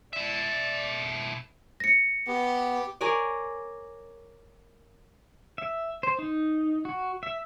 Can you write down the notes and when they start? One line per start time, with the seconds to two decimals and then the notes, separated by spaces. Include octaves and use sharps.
0.13 B2 D5 E5
1.80 A#6 C#7
2.27 B3 G4
3.01 G#4 A#4 C#5 D5
5.58 E5
6.03 C5
6.19 D#4
6.85 F#4
7.23 E5